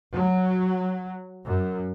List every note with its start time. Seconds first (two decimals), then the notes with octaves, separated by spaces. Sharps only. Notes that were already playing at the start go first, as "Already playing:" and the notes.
0.14 F#3
1.45 F#2